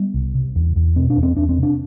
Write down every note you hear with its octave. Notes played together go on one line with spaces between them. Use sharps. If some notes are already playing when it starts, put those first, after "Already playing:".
Already playing: G3 B3
C2
C3
E2
E2
B2 C4
D4
E2
C4
E2 D4
C4
C3 D4